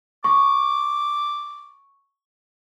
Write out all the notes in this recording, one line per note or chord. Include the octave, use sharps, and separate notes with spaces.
C#6 D6